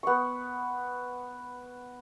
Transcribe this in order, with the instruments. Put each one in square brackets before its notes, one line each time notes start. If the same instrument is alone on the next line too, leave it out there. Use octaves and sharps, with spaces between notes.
[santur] B3 C#6